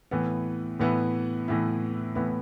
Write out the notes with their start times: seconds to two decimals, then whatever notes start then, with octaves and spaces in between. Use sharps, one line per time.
0.11 A2 E3 B3 E4
0.80 A2 E3 B3 E4
1.48 A2 E3 B3 E4
2.15 A2 E3 B3 E4